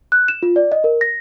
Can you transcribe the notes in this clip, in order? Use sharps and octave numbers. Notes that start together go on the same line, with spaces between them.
F#6
E7
F4
D5
D#5
A#4
A#6